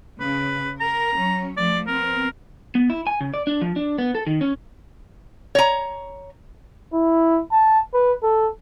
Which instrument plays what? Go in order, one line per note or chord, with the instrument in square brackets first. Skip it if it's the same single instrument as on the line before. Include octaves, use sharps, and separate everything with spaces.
[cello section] C#3 [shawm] B4
[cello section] A#4 [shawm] A#5
[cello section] F#3 C#4
[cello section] F3 A3 [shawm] D5
[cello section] B3 C4 [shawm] A#4
[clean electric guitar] B3
E4
G#5
C#3
D5
D4
F3
D4
B3
A4
D#3
C#4
[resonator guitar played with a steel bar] C#5 A#5
[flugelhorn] E4
A5
B4
A4